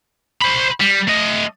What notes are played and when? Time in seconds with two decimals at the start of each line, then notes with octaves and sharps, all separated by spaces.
0.41 C5 B5
0.80 G3
1.07 A3 D#5